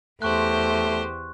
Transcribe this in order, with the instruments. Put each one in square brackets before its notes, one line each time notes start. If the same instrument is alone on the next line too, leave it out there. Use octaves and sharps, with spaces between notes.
[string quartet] E2 G4 C5 [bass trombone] A3 [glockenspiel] C6 C#6 F#6